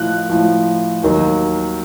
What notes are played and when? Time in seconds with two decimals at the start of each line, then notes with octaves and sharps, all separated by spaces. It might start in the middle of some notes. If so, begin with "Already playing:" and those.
Already playing: A2 F3 F#6
0.30 A2 F3
1.03 D#2 D#3 F#3